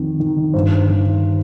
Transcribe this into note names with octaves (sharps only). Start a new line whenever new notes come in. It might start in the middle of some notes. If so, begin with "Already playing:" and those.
Already playing: F2 D#3
D#3
G2 C5
D#3